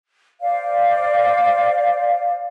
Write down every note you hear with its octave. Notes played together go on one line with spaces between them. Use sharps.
C5 D5 F5